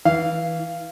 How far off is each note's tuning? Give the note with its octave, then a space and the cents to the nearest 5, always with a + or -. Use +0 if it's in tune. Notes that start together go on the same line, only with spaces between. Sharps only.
E3 -20 F5 -15